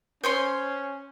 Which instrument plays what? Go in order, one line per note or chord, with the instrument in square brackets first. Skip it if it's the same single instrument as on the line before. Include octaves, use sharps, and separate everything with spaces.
[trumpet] C#4 [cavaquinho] C5 C#5 C6